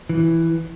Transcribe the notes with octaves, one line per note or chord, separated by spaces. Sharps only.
E3